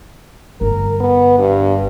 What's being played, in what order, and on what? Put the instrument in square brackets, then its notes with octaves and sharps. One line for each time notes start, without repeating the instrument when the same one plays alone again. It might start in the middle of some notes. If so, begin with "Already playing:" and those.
[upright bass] G1 [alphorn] A#4
[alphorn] B3
G2